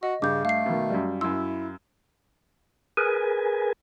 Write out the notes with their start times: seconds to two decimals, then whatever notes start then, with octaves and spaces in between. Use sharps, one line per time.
0.03 F#4 D#5
0.22 G2 C#3 D6 G6
0.45 A3 F5 C7
0.66 B2 D#3
0.90 F#2 G3
1.21 F#2 E4 C6 E6
2.97 G#4 A#4 B4 G#5